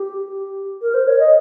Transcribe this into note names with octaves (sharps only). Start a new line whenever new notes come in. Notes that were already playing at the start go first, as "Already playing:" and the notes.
Already playing: G4
A#4
C5
C#5
D#5